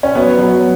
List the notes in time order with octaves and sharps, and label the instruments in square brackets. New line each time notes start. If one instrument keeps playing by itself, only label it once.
[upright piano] C#4
F#3 B3
F#3